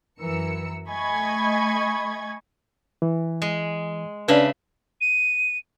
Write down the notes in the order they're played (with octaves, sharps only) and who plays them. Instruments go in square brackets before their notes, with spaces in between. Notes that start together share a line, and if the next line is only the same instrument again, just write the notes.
[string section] F#2 E3 A#4 E6 C#7
A3 D#5 G#5 B5 C#6 G#6
[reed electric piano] E3
[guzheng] G#3
[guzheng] C#3 E5 B5 [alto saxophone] D4 [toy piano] B4 D5
[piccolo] D#7